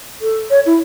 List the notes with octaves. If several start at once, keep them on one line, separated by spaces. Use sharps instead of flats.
A4
C#5
E4